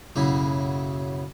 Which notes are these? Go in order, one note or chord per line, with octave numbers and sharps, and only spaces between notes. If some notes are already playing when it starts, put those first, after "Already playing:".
B1 F#2 C#3 A#3 E4